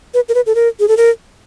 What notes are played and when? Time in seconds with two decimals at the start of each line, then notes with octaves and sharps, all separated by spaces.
0.14 B4
0.29 A#4
0.35 B4
0.46 A4
0.55 A#4
0.80 G#4
0.88 A4
0.97 A#4